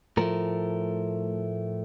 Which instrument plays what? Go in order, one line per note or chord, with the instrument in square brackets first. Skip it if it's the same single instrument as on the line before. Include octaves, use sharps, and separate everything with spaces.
[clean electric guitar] A2 F3 A3 A#4